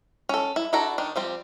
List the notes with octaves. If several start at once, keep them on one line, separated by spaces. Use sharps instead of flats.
C#4 A4
E4
D4 E4 F#4 A4 A#5
D#3 D4
F3 G3 C4